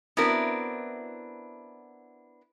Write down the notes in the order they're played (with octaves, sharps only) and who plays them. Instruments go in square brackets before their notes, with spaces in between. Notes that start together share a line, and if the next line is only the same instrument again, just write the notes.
[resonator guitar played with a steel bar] B3 C4 D4 E4 F#4 A#4